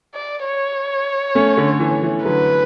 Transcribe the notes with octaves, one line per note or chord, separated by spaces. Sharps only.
D5
C#5
A3 C#4
D3
E3
E3
D3 F#3 B4